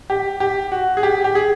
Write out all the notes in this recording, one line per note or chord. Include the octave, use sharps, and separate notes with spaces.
G4
G4
F#4
G#4
G4
G4
G#4